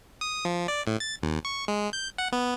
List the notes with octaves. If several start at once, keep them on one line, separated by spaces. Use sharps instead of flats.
D#6
F3
D5
A2
A6
D#2
C#6
G#3
G6
F#5
B3